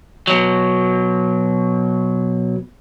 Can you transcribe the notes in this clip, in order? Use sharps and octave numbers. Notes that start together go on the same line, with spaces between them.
B2 F#3